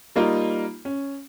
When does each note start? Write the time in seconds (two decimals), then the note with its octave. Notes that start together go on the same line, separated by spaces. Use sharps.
0.16 G3 A#3 D#4 F4
0.85 C#4